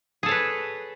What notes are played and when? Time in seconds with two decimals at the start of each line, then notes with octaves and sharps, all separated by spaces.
0.23 G#4
0.26 A4
0.29 C#5
0.31 B4